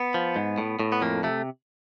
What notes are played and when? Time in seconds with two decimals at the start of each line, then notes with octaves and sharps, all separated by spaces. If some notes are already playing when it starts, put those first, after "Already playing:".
Already playing: B3
0.14 F3
0.36 G#2
0.58 A2
0.79 A2
0.92 B3
1.02 F2 A#3
1.23 C3 A3